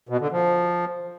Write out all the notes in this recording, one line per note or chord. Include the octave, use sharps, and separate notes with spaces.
B2
D3
F3